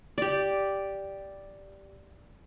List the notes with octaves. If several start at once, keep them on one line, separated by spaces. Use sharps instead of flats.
G4 D5